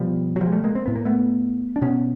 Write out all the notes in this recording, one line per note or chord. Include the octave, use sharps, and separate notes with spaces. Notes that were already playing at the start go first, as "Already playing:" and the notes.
Already playing: B2 F3 G3
F#3
F3 G3
G#3
G3 A3
G#3 A#3
C4
A2 B3
A#3
A3 B3
D4
B2 B3 C#4